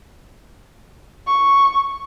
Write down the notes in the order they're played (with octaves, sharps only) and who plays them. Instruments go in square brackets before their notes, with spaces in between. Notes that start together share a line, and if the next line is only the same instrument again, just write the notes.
[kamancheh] C#6